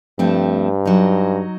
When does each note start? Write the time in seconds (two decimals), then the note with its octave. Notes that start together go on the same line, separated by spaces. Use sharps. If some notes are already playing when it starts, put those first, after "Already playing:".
0.19 G2 F3 A3 C4
0.85 F#3 D#4